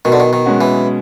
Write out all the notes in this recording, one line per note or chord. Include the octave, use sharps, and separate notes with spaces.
B2 D#3
D3
D#3
D#3
G#3 C#4 F#4
E3